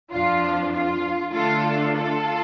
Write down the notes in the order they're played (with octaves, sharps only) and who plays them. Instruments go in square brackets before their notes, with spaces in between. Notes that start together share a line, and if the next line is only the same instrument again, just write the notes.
[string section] F2 F3 D4 F4
F4
D3 A3 D4 F4 A4
F4 A4